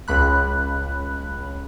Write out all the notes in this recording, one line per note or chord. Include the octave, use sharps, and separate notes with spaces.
C#2 B5 F#6